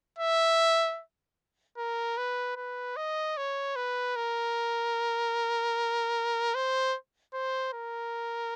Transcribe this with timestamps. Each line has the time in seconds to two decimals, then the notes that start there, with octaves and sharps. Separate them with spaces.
0.19 E5
1.78 A#4
2.18 B4
2.56 B4
2.97 D#5
3.37 C#5
3.76 B4
4.16 A#4
6.55 C5
7.34 C5
7.73 A#4